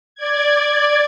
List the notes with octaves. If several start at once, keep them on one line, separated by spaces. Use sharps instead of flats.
D5 G#6